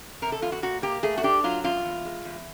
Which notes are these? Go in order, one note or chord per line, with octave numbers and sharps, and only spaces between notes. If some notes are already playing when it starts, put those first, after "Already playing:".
C3 A#4
A4
E2 F4
F#4
A#2 F#4
A#3 G4
A3 G#4
F#4
D4 G4
F#3 F4
F#2 F4
E2
G#3
E2